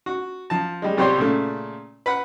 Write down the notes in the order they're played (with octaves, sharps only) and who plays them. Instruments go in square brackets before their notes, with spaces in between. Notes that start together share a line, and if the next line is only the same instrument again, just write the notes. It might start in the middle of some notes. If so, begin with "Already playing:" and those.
[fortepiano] F#4
F3 A5
G3 G#3
C2 G3 C4 G4 C#5 C6
A#2 C#3 A3
B4 F#5